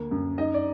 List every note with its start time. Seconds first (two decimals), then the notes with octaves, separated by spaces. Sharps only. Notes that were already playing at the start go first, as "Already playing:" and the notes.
Already playing: D2 A#3
0.11 F#2
0.38 D#4 D#5
0.54 D5